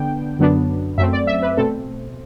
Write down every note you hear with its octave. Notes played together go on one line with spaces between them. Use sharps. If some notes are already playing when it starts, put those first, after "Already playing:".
Already playing: D3 B3 D4 G5
F#2 D3 F#3 B3 D4
F#2 F#3 A3 C4 E5
D5
E5
B4
B2 A3 C4 A4